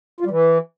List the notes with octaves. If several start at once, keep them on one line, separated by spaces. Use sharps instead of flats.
F4
G3
E3